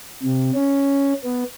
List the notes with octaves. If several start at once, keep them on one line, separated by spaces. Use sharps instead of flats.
C3
C#4
B3